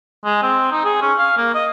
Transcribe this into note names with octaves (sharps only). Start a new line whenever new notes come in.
G#3
C4
D#4
G#4
C#4
F5
A#3
D#5